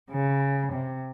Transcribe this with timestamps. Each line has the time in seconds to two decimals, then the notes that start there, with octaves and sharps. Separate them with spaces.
0.10 C#3
0.73 C3